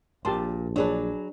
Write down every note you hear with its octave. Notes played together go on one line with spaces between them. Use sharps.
A#1 A#2 G4 A5 C6
F#3 D4 G#4 B4